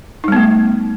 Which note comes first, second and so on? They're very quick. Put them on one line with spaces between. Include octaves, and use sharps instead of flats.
D#4 G3 B3 A3